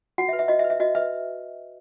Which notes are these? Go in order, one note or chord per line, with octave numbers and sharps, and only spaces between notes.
F#4 F#5
E5
B4
E5
F#4 D#5
E5
B4
E5
F#4 D#5
B4 E5